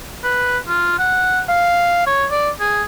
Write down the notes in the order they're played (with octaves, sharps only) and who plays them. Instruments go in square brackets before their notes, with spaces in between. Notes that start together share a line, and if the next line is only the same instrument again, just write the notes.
[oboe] B4
F4
F#5
F5
C#5
D5
G#4